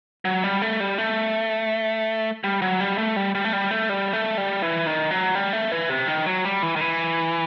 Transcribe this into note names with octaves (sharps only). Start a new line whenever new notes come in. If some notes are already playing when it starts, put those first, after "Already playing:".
F#3
G3
A3
G3
A3
G3
F#3
G3
A3
G3
G3
A3
G3
A3
G3
A3
G3
E3
D#3
F#3
G3
A3
E3
C3
D#3
F#3
G3
E3
D#3
E3